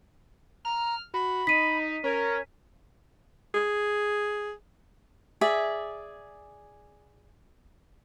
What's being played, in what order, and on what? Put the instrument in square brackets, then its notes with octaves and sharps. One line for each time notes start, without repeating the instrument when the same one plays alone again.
[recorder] A#5 [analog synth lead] F6
[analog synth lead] F#4 [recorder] B5
[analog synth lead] D#4 [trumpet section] D#5 [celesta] B6 D#7
[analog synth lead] C#4 [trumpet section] A#4 [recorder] C#5
[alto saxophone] G#4
[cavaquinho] G#4 D5 E5